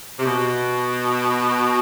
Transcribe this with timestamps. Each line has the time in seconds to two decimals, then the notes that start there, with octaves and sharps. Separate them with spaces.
0.19 C3
0.26 B2